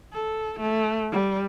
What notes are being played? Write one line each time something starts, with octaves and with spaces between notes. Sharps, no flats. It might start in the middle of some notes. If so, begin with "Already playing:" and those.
A4
A3
G3